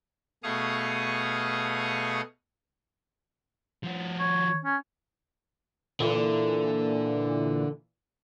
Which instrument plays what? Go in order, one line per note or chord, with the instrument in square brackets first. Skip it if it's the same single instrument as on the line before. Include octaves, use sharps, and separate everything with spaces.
[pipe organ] B2 A3 G#4 F5 C#6 D#6
[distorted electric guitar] F3 F#4
[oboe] C#5
C#4
[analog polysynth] A#2 E3 [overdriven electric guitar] D3